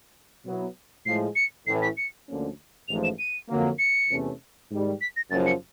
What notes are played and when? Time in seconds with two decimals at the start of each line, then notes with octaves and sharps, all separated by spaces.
0.45 B2 F#3 B3 E4
1.06 A2 F3 G#3 C7
1.36 C#7
1.66 A1 A2 E3 C7
1.82 B6
1.97 C#7
2.27 D2 D3 F3 A#3 C#4
2.88 A1 G#2 F3 F7
3.04 E7
3.19 D#7
3.49 F2 D3 F#3 A#3
3.79 C#7
4.10 E2 C3 E3 A3 C#4
4.70 G#2 D#3 G3
5.01 B6
5.16 A#6
5.31 F#1 F#2 C#3 F3 A6
5.46 C#7